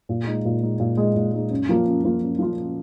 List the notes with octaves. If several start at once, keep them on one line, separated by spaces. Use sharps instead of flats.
A#2
G#3 D#4
A#2
G#3 D#4
A#2
G#3 D#4
A#2
G#3 D#4
F#2
F3 A#3 F4
F#2
F3 A#3 F4
F#2
F3 A#3 F4